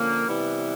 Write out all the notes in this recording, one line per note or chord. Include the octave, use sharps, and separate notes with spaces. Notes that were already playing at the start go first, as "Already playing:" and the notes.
Already playing: D3 F3 A#3 C#4
C3 E3 G3 B3 E4